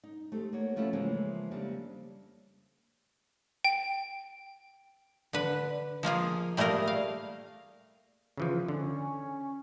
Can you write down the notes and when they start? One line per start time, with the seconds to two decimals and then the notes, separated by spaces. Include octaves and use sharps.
0.04 D#4
0.32 A3 C4 G4
0.53 A#3 B3 C#5
0.76 F3 A3 C#4 E4 F4
0.93 C#3 E3 F3 G#3 A#3 C4
1.51 F2 C#3 G3 A#3 C4 D4
3.65 G5
5.33 D3 B4
6.03 F3 A#3 F4 G#4
6.57 G3 A3 A#3 G#4 A#4
6.87 F5
8.37 C#3 E3 F3 G#4
8.68 D3 C#4